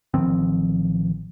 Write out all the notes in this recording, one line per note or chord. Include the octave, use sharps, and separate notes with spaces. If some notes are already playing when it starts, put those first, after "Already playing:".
A1 D#3 F3 C4